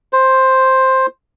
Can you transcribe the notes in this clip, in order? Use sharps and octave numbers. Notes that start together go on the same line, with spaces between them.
C5